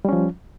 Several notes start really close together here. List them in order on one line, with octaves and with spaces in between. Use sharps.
G3 C#4 F3